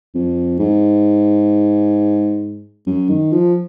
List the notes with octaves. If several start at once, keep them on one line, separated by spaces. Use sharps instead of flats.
F2
G#2
F#2
D#3
F3